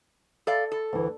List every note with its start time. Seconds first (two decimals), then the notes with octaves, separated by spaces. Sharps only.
0.47 A4 D5 F5
0.72 A4
0.93 D2 E3